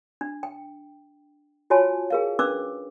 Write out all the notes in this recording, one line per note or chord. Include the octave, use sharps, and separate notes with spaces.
D4
G5
F4 F#4 C#5 G#5 A5
G#4 A#4 F5
C#4 D4 B4 D6 E6